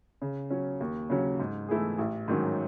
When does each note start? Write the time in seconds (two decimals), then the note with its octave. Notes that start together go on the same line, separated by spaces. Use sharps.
0.22 C#3
0.50 F#3 C#4
0.81 D#2
1.10 C#3 F#3 C#4
1.40 G#2
1.69 E3 A3 E4 G#4
1.98 A1
2.28 G#2 D#3 F#3 C#4